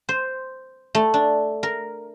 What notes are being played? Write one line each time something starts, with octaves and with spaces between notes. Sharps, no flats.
C5
A3
D4
A#4